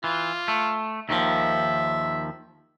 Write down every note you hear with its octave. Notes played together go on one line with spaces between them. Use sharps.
E3 F4
A3
D#2 D#3 F3 E5